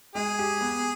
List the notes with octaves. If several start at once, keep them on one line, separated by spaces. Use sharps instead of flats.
G#3 G#4
G4
B3